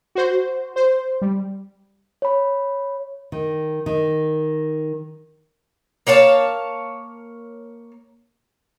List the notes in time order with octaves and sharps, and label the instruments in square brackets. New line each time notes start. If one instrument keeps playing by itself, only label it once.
[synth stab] F#4 C5
C5
G3
[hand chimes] C#5 B5
[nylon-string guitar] D#3
D#3
[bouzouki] A#3 C#5 F5 A5